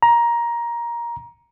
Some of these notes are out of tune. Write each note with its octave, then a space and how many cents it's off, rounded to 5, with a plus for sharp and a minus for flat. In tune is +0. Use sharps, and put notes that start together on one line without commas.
A#5 +15